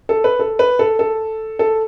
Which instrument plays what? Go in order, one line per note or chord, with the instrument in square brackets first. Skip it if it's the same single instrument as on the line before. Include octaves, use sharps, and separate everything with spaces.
[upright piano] A4
B4
A4
B4
A4
A4
A4